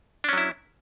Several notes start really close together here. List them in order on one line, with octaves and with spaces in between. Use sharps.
D4 C#4 F#3 E4